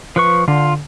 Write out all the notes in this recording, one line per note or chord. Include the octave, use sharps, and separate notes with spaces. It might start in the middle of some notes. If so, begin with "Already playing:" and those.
F3 B4 C#6
D3 F4